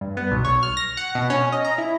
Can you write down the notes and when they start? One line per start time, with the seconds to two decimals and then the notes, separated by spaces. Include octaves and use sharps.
0.01 G2
0.17 B3
0.32 B1
0.45 C#5
0.63 F6
0.77 A#6
0.97 F#5
1.15 B2
1.30 C#4
1.52 D#5
1.65 A#5
1.78 E4